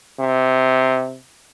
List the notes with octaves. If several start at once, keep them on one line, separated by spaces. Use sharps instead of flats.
C3